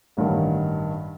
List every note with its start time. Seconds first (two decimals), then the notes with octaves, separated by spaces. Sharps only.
0.17 A1 G2 D#3